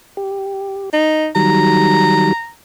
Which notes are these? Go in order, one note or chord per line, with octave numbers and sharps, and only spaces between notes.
G4
D#4
D#3 F#3 G3 A#5